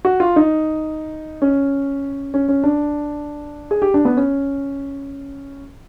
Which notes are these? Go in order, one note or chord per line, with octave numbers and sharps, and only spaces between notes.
F#4
F4
D#4
C#4
C#4
C#4
D4
G#4
G4
D4
B3
C#4